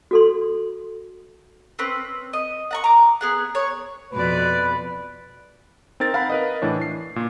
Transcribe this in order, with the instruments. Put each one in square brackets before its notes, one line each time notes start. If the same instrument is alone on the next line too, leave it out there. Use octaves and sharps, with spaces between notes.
[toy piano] F#4 A4 C6
[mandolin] C4 C#4 B4
D#5
F#5 A#5 C#6
A#5 D6
B3 G#4 F#5
C#5 C#6
[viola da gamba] F2 B2 D5 [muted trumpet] B4
[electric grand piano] C4 D#4 A#4 A6
A#4 F5 F#5 B5
A#4 B4 D#5
A2 E3 D4 C#5
C7
A#2